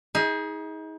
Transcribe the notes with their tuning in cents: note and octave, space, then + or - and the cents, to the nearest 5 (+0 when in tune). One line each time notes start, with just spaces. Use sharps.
D#4 +35 G#4 +0